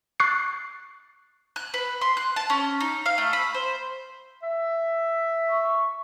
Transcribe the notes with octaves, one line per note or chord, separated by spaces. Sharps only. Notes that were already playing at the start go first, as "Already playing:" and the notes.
C#6 F#6 A6 C7
F#6
B4
C6
F#6
A5
C#4
D#4
F5
A3
B5
C5
E5
C#6